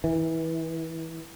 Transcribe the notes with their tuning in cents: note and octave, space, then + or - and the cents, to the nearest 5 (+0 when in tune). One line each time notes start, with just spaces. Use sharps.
E3 -25